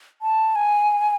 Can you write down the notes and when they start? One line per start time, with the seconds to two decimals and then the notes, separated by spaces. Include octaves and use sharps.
0.22 A5
0.56 G#5